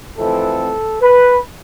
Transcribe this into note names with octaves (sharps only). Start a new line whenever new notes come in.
F2 E3 A3 C4 A4
B4